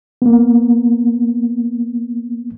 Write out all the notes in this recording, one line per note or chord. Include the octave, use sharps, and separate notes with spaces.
A#3 B3